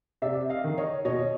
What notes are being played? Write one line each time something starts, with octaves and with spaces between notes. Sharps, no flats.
C3 D5 E5
D#5 F5
D#3
C#5 D#5
B2 C#5 D#5